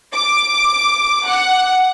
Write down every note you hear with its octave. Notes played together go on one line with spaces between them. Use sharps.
D6
F#5